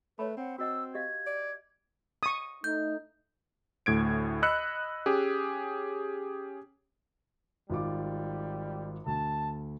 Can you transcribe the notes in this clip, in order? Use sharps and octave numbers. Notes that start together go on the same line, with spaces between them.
A3 B4 C#5 B5
C4 F#5
C4 F#4 D#5 F#5 E6
G4 D#5 F5 G#6
D5
C#6 D#6
A3 D#4 G6
D2 A2 G#6 D7
D#5 B5 E6 F#6 C#7
C#4 G4 G#4
G#1 G3 F4 D6
D2 A5